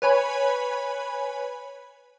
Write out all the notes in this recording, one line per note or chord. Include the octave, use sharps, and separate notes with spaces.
B4 C#5 G#5 B5